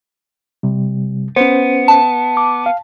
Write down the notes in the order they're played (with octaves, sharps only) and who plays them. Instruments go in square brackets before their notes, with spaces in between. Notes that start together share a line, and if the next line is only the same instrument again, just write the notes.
[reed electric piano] C3 G3
[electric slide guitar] B3 [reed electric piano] C#4 C5
[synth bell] A5
[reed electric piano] D6
F5